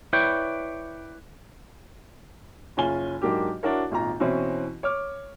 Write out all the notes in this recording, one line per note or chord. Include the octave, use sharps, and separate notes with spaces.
E4 B4 C#5 D5 G5
F#1 C#4 F4 G#5 G7
G#2 F#3 A#3 D4 G4
D4 E4 F#4 A#4 C#5
D#1 G#1 F4 A#5
B2 E3 C4 C#4 E4
C#5 D6 F6